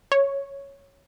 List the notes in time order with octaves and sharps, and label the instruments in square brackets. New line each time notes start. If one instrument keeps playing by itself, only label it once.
[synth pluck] C#5